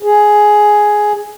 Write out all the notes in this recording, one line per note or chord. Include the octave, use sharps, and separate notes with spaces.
G#4